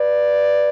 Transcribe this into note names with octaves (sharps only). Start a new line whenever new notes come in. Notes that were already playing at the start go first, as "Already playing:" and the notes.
Already playing: B4 D5